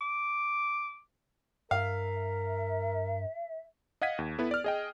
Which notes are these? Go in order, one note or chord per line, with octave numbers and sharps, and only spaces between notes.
D6
G2 A#4 E5 F5
D#5 F5 F#5 G#6 B6 D#7
D#2
B3 E4 A4 B4
D5 F6
G#4 D#5 G5